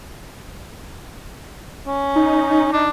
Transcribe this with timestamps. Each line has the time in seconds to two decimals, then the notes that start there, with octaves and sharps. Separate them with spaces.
1.87 C#4
2.16 D#4
2.73 D4